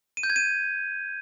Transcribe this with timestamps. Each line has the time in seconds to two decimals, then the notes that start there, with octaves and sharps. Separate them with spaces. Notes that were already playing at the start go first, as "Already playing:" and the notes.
0.17 D#7
0.23 G6
0.30 G#6
0.36 D#7